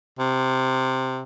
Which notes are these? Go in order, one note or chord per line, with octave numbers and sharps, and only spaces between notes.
C3